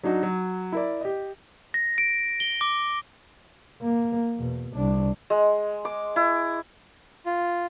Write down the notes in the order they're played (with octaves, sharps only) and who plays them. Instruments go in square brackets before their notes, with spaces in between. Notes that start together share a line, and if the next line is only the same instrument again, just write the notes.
[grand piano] F#3 D4 D#4 F#4
F#3
E4 A#4 D5
G4 D#5
[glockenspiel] A#6
D7
G7
D6
[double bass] A#3
E2 B2
C2 D4
[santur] G#3
D6
E4
[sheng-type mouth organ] F4